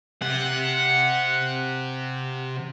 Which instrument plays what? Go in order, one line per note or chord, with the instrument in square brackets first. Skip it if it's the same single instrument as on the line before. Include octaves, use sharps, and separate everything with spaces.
[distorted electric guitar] C3 [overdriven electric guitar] F#5